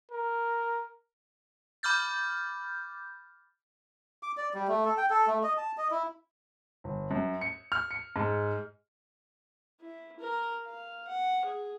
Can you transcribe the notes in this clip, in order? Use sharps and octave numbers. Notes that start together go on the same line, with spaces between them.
A#4
B5 D6 F6 G6 A6
D6
D5
G3
A3
A4
G5
A4
A3
D#5
A5
D#5
E4
G1
F#2
C#7
F6
C#7
G#2
E4
A#4
F5
F#5
G#4